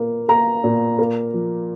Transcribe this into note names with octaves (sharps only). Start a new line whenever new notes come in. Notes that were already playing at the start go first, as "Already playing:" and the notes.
Already playing: A#2 A#3
A#3 A#5
A#2
A#3
F3